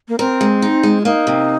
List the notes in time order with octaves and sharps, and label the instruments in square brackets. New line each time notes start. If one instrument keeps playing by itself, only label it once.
[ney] A#3
[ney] C4 [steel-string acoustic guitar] A#4
[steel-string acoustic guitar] G#3
D#4
G#3
[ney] F4
[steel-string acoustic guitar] A#3 [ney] D#4
[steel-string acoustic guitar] C3